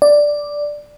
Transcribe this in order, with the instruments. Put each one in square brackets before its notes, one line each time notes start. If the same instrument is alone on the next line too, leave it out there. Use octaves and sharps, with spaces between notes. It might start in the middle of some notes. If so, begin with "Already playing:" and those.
[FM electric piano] D5